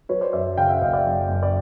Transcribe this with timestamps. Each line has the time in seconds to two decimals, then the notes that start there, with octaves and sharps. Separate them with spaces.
0.09 F#3 B4 C#5
0.21 C5 D5
0.33 F#2 D5 E5
0.57 C#3 F5 G5
0.69 E5 F#5
0.81 F#1 D#5 F5
0.93 D5 E5
1.05 F#2
1.29 F#2
1.43 D5